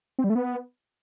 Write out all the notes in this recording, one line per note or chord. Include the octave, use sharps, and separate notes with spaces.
C4
G3
A3
B3